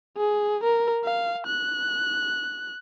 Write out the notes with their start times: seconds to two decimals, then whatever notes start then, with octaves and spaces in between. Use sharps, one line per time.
0.17 G#4
0.63 A#4
1.04 F5
1.47 F#6